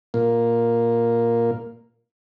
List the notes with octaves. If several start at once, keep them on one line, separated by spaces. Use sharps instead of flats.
A#2 A#3